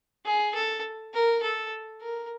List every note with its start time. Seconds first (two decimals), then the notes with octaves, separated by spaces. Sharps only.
0.25 G#4
0.54 A4
1.13 A#4
1.42 A4
2.01 A#4